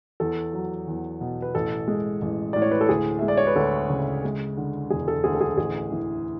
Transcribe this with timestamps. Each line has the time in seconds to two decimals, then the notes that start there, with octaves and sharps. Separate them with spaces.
0.20 E2 A4
0.53 F#3
0.88 E2
1.21 B2
1.42 B4
1.55 A1 A4
1.88 G#3
2.22 A1
2.53 A2 D5
2.62 C#5
2.71 B4
2.81 A4
2.89 D2 G#4
3.19 G#3 E5
3.28 D5
3.37 C#5
3.47 B4
3.56 D2 A4
3.89 C#3
4.24 G#3
4.57 D3
4.90 E1 G#4
5.08 A4
5.24 D2 G#4
5.35 A4
5.41 G#4
5.57 A1 G#4
5.92 E3